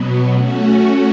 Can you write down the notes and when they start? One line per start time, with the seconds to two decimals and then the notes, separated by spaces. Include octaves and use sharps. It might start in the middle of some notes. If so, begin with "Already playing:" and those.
Already playing: B2 F#3 B3
0.32 A3 C#4 F#4